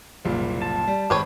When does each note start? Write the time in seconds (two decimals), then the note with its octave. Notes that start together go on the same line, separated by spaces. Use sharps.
0.25 F#1 C2 A#2
0.62 A5
0.87 G3
1.10 G#1 G4 B4 C#5